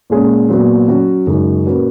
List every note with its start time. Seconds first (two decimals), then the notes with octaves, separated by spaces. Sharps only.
0.10 A#2 G#3 C#4 G#4
0.48 A#2 F#3 B3 F#4
0.88 F#3 C#4 F#4
1.27 F#2 C#3 G#3 D#4 F#4
1.66 A#2 A#3 C#4 F#4 B4